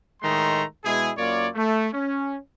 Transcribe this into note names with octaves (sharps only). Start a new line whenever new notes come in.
A2 D#3 G#3 A3 A#5 C6
B2 G#3 E4 G#4
F#2 A#3 F4 C#5 D5
A3
C#4